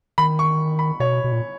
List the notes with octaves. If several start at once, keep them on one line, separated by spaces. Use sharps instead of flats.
D#3 B5
C#6
B5
B2 C#5
B2
A#2